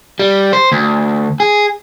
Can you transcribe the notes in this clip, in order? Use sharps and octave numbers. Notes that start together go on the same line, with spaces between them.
G3
C5
D2
G#4